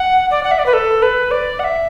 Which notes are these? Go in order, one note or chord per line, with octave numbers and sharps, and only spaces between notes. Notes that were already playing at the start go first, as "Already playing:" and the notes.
Already playing: F#5
D5
F#5
E5
D5
B4
A4
B4
D5
F#5
E5